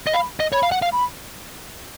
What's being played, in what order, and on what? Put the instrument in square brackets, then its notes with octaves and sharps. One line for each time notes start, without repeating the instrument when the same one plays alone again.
[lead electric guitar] D#5
[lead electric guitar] F5 [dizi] B5
[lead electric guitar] D#5
[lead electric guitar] C#5 [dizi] B5
[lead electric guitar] F5
F#5
F5
[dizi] B5